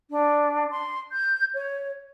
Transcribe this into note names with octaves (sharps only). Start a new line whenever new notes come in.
D4
C6
G6
C#5